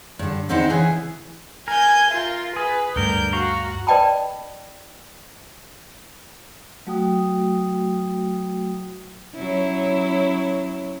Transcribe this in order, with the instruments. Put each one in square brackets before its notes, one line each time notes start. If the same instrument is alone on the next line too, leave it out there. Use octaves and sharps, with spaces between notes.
[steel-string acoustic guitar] G2 D3
E2 D3 C4 D#4 E4 F#5
C#3 E3 G#4
[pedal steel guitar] A#4 [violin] G#5 G6
[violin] F4 [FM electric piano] E5
[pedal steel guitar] G#4 [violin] B4
[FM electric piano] D2 G2 A3 [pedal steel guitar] D3 A#4 [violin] G6
[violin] F#4 [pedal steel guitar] F5 A#5 C#6
[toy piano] B4 D5 D#5 G5 A5 B5
[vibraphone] F#3 A3 F#4 G5 D#6
[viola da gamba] F#3 C#4 E4